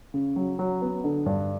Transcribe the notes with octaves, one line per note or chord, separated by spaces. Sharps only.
C#3
F#3
F#3
B3
D3
G2